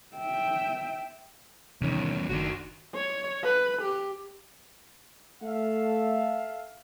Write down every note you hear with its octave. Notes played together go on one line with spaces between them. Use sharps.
E5 G5
E2 C3 D#3 C#4
F#1 B2 D#3 D4 F#4
C#5
B4
G4
A3 A4 E5 F5